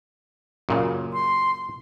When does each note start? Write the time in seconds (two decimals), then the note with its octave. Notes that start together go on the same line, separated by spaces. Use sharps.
0.69 F#2 A#2 C#3
1.13 C6